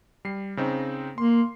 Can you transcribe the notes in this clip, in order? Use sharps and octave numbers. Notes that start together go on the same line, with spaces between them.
G3 C7
C#3 C4 D#4
A#3 C6